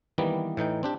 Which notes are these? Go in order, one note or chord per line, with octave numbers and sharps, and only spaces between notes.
D#3 E3 G3 A#3 B3
A2 E3 D#4 G5
C4 D4 G4